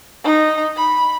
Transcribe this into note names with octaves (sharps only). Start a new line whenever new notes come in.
D#4
B5